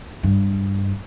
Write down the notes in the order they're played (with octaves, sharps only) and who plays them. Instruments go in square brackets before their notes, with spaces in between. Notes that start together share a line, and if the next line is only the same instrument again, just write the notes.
[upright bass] G2